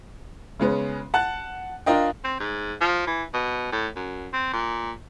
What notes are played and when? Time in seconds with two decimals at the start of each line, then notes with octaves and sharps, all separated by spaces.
0.60 C#3 G#3 B3 C#4
1.14 F#5 A5 F#6
1.86 D4 F4 A#4 D#5 F5 G5
2.24 C4
2.40 G#2
2.81 F3
3.07 E3
3.33 B2
3.72 A2
3.96 F#2
4.33 C4
4.53 A#2